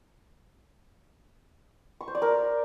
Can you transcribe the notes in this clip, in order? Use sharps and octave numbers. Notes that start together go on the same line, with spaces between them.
C#6
C5
D5
A#4